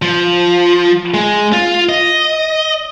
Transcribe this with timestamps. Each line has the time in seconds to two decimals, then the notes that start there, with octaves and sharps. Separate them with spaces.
0.02 F3
1.14 G#3
1.53 F4
1.89 D#5